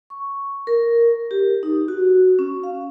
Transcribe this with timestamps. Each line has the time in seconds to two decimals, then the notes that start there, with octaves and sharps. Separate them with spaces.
0.10 C#6
0.67 A#4
1.31 G4
1.63 D#4
1.88 F#4
2.39 C#4
2.63 F5